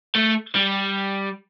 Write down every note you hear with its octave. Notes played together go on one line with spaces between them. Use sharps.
A3
G3